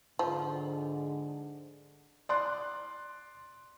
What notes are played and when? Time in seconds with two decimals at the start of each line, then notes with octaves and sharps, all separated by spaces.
0.19 G#2 D3 F3
2.29 D5 C6 F#6